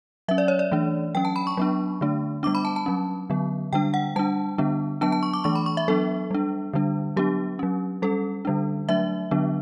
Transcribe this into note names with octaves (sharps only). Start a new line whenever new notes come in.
F#3 C#4 E5
D5
C#5
D5
E3 A3 D4
F#3 C#4 G5
A5
B5
C#6
F#3 B3 D4
D3 A3 D4
G3 B3 D4 D6
B5
A5
A5
F#3 C#4
D3 F#3 B3
D3 G3 D4 G5
F#5
G3 D4 A5
D3 G3 B3 D4
F#3 B3 D4 A5
A5
C#6
D6
E3 A3 D4 C#6
B5
C#6
E5
F#3 B3 D4 A4
G3 D4
D3 G3 D4
F#3 B3 D4 G4
F#3 C#4
G3 C#4 A4
D3 G3 D4
F#3 A3 D4 E5
D3 F#3 B3 D4